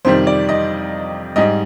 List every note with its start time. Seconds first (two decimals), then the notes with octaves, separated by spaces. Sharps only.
0.05 F2 C3 D#3 G3 C5
0.27 D5
0.49 D#5
1.36 G#2 G3 D#5